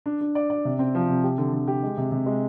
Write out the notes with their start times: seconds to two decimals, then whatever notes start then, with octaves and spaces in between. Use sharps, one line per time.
0.06 D4
0.21 D4
0.35 D5
0.50 D5
0.65 C3
0.79 C4
0.95 F3
1.09 C3
1.23 G4
1.38 D3
1.53 D3
1.68 G4
1.83 G#3
1.98 C3
2.12 C3
2.26 G#3